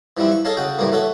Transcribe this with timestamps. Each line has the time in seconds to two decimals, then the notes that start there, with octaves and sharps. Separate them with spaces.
0.17 E3 F3 G3 C4 E4
0.32 C#6
0.45 G#4 A4 C#5 D#5 F5 A5
0.57 C#3 F#4 G5
0.79 E2 A2 E3 G3 A#3
0.92 A3 F#4 A4 C#5 E5